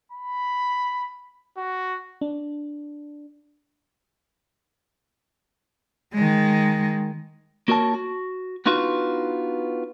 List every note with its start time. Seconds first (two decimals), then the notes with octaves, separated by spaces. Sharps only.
0.12 B5
1.57 F#4
2.21 D4
6.14 D#3 G#3
7.68 A#3 F#4 A#4 C#5 A5
7.94 F#4
8.66 B3 D4 D#4 F4 F#4 B4